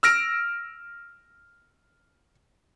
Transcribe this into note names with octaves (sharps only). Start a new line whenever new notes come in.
E6 F6 A#6 D7